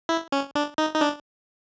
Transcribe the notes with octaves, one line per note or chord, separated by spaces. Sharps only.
E4
C#4
D4
D#4
D#4
D4